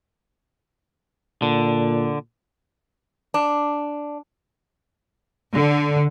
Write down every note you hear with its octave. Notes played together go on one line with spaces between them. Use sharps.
A#2 D3
D4
D3